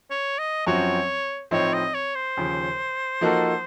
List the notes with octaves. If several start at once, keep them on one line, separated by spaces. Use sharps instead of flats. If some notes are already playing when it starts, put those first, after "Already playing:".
C#5
D#5
F#2 F3 C4 F#4 C#5
A2 F3 C4 D#4 C#5
D#5
C#5
C5
D#2 C#3 F3
F3 A#3 D#4 F#4 A4